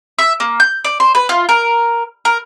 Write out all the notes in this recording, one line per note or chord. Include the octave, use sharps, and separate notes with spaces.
E5
A#3
G6
D5
C5
B4
F4
A#4
A#4